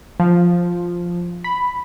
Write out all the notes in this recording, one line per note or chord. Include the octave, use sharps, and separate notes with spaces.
F3
B5